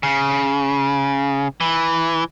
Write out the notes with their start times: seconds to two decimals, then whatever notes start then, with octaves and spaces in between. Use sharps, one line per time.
0.03 C#3
1.61 E3